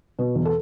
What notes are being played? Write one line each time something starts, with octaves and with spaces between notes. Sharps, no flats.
B2
E2
A4